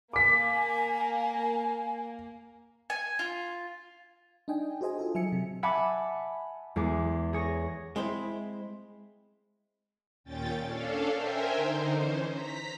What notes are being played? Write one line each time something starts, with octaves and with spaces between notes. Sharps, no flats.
A#3 G#5 D6 B6
G#5
F4
D4 D#4 D#5 G5 G#5
F#4 G#4 C5 D#5 G#5
F4 A4
F#3 E5 G#5 C#7
C3
E5 F#5 G#5 A5 B5 D6
E2 G#3 G#4 D6 C7
G#4 C#5 A#6
G#3 C4 E4 C5
D#2 A#2 C#4 G5 A6
C#4 D4 A4 F5
A#4 C5 E5 G5 G#5
D3 D#4 C5
E3 C#4 C5
A#5 B6